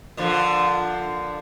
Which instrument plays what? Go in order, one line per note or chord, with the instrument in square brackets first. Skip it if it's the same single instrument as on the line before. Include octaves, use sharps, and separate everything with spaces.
[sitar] A#2 D3 F3